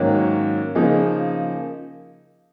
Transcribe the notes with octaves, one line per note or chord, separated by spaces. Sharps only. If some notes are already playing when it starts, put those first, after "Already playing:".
Already playing: G#2 D#3 F#3 A#3 C#4
C#3 F3 A#3 D#4 G#4